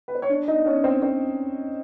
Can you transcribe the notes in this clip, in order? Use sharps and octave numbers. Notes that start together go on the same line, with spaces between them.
B4
C5
C#5
D4 D5
D#4 D#5
C#4 C#5
C4 C5
C4 C5